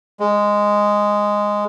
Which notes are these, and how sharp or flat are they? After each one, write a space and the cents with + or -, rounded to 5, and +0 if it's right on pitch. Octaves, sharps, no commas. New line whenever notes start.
G#3 -5